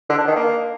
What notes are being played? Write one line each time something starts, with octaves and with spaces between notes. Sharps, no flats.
D3
D4
D#3
A#3